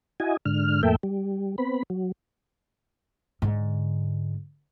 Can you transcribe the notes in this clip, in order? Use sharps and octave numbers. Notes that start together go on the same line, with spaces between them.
E4 F#4 D#5 G#5
G#2 D3 F6
F2 A2 A#3 A4 E5 G5
G3
B3 C4 B5
F#3
G#2 D3